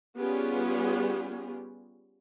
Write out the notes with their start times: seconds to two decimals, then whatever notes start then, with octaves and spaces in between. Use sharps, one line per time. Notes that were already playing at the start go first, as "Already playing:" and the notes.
0.19 G3 B3 C#4 F4 G4 G#4